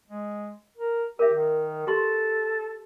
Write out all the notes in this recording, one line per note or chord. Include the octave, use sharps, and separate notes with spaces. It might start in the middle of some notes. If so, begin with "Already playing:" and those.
G#3
A#4
G4 A#4 E5
D#3
G4 A4 C6